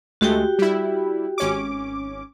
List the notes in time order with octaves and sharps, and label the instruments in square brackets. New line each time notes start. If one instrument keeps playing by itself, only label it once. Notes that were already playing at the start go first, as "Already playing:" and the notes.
[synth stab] D2 G#3 A3 [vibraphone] F#4 G4 G5
[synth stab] G3 E4
G#1 C#4 D6